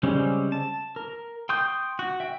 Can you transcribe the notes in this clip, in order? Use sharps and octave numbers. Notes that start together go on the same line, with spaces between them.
C#3 G3 G#3 C4 C#4
A5
A#4
G5 C6 C#6 D#6 G6
F#4
E5 G5